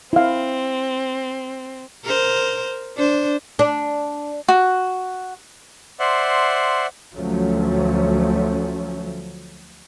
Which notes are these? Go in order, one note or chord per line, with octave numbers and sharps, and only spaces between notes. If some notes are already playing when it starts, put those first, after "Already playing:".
C4 E4 F5
A#4 C5
D4 C5
D4
F#4
C5 D5 E5 F#5 C6
D2 F3 F#3 A3 C#4